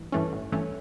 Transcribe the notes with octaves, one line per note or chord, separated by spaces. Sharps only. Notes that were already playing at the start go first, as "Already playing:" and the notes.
Already playing: A1 G2
G2 E3 A3 C#4
A1
G2 E3 A3 C#4